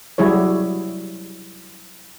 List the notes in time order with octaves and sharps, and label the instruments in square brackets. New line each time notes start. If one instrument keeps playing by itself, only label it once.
[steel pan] F#3 G3 E4 G#4 C#5